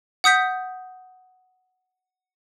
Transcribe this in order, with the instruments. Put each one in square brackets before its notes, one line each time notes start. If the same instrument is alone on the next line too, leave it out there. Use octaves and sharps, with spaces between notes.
[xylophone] F#5 D#6 G6 B6